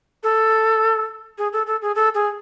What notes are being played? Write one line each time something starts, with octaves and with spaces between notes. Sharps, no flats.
A4
G#4
A4
A4
G#4
A4
G#4